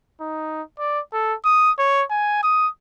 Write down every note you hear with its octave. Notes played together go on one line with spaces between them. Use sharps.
D#4
D5
A4
D#6
C#5
G#5
D#6